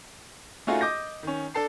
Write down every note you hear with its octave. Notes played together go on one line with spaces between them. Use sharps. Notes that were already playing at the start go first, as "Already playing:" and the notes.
A3 C#4 D#4 F4 F#4 G#4
D#5 D6 G6 A#6
D#3 C#4
D4 A4 A5 C7